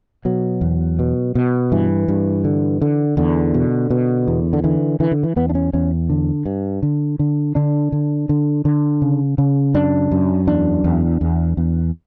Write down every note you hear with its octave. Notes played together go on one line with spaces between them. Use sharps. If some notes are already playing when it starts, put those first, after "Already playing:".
B2 F#3
E2
B2
B2
G2 E3
G2
D3
D3
E2 D3
B2
B2
E2
D3
D3 E3
D3 E3
D3
E3
E2 B3
D4
C#4
E2 C#4
D3
G2
D3
D3
D3 D4
D3
D3
D3
C#3
C#3
F#2 D4
F#2
E2 D4
E2
E2
E2